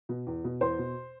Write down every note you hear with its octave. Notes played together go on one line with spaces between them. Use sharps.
B2
E2
B2
E2 C5 C6
B2